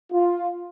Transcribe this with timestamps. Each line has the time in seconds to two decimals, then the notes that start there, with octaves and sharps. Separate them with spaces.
0.12 F4